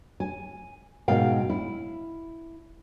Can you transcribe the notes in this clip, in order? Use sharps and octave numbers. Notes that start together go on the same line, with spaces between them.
G#5
G#2 B2 A#4 F5 G5
E4